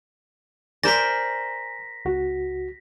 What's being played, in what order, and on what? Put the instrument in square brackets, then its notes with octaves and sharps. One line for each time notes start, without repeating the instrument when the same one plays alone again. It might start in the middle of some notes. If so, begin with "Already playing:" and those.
[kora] A#4 C5 D5 [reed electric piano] G#5 [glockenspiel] A#6 B6
[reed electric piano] C#2 F#4